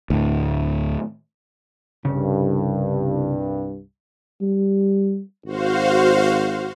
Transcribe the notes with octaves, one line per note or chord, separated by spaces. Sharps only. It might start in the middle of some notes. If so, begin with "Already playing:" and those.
D2 A2
C2 G2 C#3
G3
G#1 F#4 C5 F5